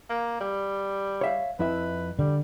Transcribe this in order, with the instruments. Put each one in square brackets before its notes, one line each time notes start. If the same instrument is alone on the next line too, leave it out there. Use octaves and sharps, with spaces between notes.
[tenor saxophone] A#3
G3
[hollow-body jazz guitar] C#5 E5 F5
[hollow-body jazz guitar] F2 E4 E5 [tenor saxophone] B4
[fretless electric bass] D3 [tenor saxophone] G3